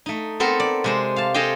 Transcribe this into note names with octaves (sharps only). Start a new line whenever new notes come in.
A3 D#4
B3 C4 A4 A#4 C6
D5
C3 G#3 C5
F5 A5
G#4 A4 C5 D#5 F5 G5